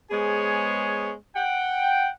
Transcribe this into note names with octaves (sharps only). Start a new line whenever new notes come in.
G#3 B3 G#4 C5 C#5 G#5
F#5 G5